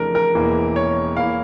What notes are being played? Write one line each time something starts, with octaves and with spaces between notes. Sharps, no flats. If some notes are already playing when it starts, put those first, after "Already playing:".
Already playing: F2 C#3 E3 A3 D4 A#4
A#4
E1 E2 E3 A#3
C#5
E2 E3 A#3 E4 F5